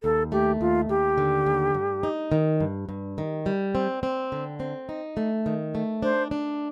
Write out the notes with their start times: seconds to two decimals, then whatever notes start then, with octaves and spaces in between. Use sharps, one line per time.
0.03 D#2 A4
0.32 A3 G4
0.61 D#2 F4
0.89 D#2 G4
1.18 D3
1.46 D#2
1.74 G2
2.03 D#4
2.32 D#3
2.60 G2
2.89 G2
3.18 D#3
3.46 G3
3.75 C4
4.03 C4
4.32 D3
4.60 C4
4.89 D#4
5.17 A3
5.46 D#3
5.75 A3
6.03 D4 C5
6.31 D4